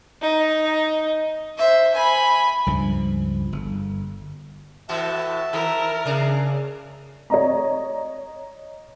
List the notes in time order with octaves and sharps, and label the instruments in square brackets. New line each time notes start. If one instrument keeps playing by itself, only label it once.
[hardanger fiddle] D#4
C5 E5
G#5 B5
[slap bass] C#2 G2 F3
G1
[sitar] A2 E3 F#4 [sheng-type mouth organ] E5 A5
[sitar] D#3 [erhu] A#4
[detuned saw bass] C#3 [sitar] D4 G#4
[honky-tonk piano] C#5 D#5 A#5